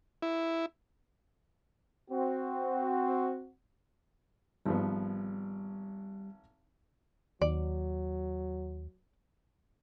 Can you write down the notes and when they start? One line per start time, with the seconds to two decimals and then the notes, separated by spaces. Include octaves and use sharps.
0.22 E4
2.11 C4 F#4
4.66 G#1 F3 G3 B3
7.42 D#2 F#3 D5